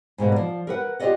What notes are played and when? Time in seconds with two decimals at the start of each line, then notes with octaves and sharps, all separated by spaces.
0.18 G#2 B2 A#3 B3
0.32 F3 D5
0.67 A#4 B4 F#5
1.00 F4 G4 B4 D5 D#5 F#5